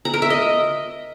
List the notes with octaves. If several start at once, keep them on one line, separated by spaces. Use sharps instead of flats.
A#5
A#4
E5
D#5